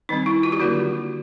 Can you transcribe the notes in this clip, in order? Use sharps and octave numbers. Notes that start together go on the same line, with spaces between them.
D#3 G3 C4 D#4
E4
F4
G4
D3 F#3 A#3 D4 F#4